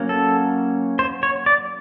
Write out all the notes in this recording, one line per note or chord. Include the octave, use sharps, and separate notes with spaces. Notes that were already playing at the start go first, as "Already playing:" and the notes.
Already playing: F#3 A#3 C#4
A4
C5
C#5
D5